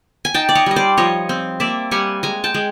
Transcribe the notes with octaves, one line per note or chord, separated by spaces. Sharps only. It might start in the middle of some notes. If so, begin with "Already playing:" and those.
G#5
D#4 G5 A5
D5
C#5 D#5
G3 D#5
C5 D5
F3 C#5 D#5
C4
A#3 D5 E5
G3 F#5 G#5
G#3 G#5 A#5
G5 A5
G#3